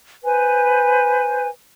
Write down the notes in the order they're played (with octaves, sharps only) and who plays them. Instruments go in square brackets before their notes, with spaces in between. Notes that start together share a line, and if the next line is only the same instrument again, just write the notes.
[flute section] B4 C5 G#5